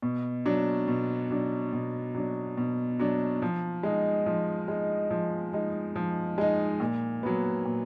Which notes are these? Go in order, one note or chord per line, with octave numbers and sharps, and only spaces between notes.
B2
F#3 D4
B2
F#3 D4
B2
F#3 D4
B2
F#3 D4
F3
G#3 D#4
F3
G#3 D#4
F3
G#3 D#4
F3
G#3 D#4
A#2
F#3 B3
A#2